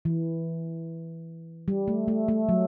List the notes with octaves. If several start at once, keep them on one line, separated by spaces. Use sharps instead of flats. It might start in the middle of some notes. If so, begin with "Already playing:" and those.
E3
G3
A3
A3
A3
F#3